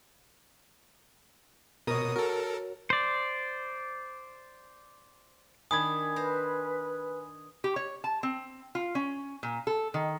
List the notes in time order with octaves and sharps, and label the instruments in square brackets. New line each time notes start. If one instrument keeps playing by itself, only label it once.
[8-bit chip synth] B2 D#6 [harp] A#4 C#5
[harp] F#4 [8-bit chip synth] A4 A#4
[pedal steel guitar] C5 D5
[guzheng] D#3 D4 [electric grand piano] G#5 B5 G#6 [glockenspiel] D#6
[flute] B4 [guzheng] C5 A#5
[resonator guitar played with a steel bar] G4
C#5
A5
C4
F4
C#4
A#2
A4
D#3